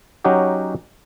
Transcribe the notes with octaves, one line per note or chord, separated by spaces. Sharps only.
F#3 C#4 D#4 F#4 G4